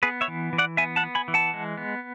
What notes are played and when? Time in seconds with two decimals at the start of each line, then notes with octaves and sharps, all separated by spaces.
0.03 B3 G#4 B4
0.21 C#5 E5
0.28 E3
0.53 E3
0.58 D5 F#5
0.77 B3 E5 G#5
0.96 F#5 A5
1.03 B3
1.15 G#5 B5
1.28 E3
1.34 F#5 A5
1.54 G#3
1.77 B3